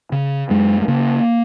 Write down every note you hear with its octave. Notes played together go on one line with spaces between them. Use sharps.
C#3
F#2 G#3
G#3
C#3 A#3